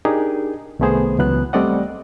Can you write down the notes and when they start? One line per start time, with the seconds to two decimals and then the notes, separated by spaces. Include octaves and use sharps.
0.05 D4 D#4 G4 G#4 A#4
0.79 C2 D#3 A3 B3 G#4 C5
1.19 C#2 E3 F#3 B3 F#6
1.53 G3 A3 C4 D5 D#5 F#5